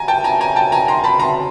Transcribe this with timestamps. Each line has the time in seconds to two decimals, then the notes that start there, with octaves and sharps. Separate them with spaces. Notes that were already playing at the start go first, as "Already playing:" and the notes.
Already playing: G#5 A#5
0.08 G5 A5
0.24 G#5 A#5
0.41 G#5 A#5
0.56 G5 A5
0.72 G#5 A#5
0.88 A#5 C6
1.04 A5 B5
1.20 A#5 C6